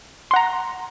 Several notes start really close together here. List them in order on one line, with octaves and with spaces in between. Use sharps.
C6 F#5 A#5